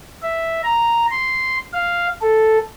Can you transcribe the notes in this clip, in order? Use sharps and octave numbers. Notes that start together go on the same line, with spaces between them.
E5
A#5
C6
F5
A4